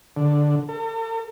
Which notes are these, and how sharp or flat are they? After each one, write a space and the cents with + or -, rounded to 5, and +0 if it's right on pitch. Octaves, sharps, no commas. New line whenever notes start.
D3 +5
A4 +45